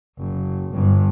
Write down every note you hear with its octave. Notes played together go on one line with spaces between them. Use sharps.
F#1
G1 G2